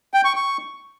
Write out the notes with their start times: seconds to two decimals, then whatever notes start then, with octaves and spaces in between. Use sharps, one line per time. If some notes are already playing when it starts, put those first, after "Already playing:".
0.14 G5
0.25 C#6
0.36 C#6